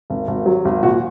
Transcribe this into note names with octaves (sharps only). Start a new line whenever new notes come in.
G#1
G#1
F#3
G#1
A#2 F#4